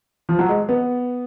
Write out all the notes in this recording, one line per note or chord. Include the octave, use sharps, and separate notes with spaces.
F3
F#3
G#3
B3